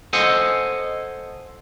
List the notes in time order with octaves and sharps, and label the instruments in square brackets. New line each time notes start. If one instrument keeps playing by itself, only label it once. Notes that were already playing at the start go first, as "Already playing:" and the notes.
[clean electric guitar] A4 C5 D#5 F#5 G#5